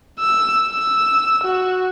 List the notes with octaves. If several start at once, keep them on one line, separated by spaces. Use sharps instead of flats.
E6
E6
F#4